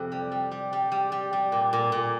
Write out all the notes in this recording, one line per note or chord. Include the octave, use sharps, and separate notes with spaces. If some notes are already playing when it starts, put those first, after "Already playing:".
Already playing: F2 C3
G3
G3
G3
G3
G3
G3
G3
A#2
A#2
A#2